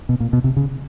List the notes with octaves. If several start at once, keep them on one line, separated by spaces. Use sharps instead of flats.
B2
A#2
B2
C3
C#3